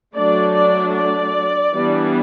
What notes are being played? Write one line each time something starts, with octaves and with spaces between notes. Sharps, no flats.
F#3 A3 D4 D5
D5
D5
E3 G3 B3 D4